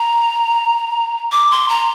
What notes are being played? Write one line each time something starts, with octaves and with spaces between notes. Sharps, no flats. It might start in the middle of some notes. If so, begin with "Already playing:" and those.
Already playing: A#5
D6
C6
A#5